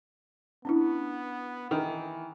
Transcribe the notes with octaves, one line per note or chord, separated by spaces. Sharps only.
B3 C#4 D4 E4
D#3 E3